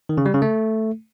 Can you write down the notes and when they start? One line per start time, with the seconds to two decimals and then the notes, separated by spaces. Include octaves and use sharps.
0.09 D#3
0.18 C#3
0.26 G3
0.34 C#3
0.42 A3